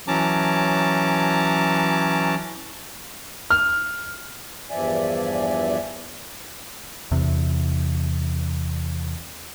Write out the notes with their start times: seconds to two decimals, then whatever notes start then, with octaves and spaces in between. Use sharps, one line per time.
0.08 E3 F#3 C#4 A5 A#5 D6
3.50 F6
4.70 E2 G2 F3 D5 E5 G#5
7.11 E2 C3